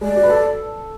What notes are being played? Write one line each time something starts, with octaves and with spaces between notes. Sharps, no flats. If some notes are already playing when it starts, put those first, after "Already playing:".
G#3 D5
F#4
B4
A4